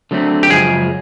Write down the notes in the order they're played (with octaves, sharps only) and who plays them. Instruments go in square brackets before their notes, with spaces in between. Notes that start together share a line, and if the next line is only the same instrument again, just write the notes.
[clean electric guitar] D3 F#3 A3 C4
[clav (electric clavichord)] G4
[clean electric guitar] F#2 C#3 F3 G#3 [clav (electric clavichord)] G#4